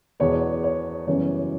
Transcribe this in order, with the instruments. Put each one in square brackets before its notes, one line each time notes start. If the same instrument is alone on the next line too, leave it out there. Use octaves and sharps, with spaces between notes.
[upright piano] E2 B2 G#3 B3 C#5
C#5
F#2 C#3 E3 G3 B3 C#5